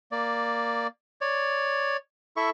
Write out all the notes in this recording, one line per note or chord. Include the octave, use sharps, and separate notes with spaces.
A#3 D5
C#5 D5
E4 A4 E5 C#6